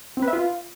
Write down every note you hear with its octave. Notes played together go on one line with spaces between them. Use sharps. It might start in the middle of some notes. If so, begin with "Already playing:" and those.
C4
B4
E5
F4